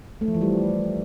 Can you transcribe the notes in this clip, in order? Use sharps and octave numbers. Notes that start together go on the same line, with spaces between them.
A3
F3
E3
G3